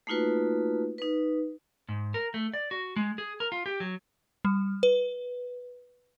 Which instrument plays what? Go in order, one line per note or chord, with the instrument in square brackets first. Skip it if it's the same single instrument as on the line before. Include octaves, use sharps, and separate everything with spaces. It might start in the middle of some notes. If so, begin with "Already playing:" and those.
[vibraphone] A3 A#3 D#4 F4 F#4 B4
D#4 B4
[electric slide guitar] G#2
A#4
A3
D5
F#4
G#3
G#4
A#4
F4
G4
F#3
[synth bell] G3
B4